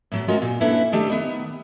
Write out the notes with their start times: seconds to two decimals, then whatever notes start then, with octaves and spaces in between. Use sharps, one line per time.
0.12 A2 F#3 B3
0.28 G#3 C#4 F4 F#4 A#4
0.42 A#2
0.60 A#3 C#4 D4 E4 A4 B4
0.92 D#3 A3 D4 G4
1.09 D#3 B3